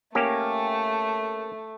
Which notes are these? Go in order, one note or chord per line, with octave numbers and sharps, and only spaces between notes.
A3 A#3 C#4 G4